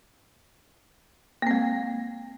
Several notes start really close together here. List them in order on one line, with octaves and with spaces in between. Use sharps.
A#3 C4 G#3